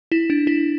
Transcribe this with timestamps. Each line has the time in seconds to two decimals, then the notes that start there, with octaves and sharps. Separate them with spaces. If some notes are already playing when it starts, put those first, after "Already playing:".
0.12 E4
0.30 D4
0.47 E4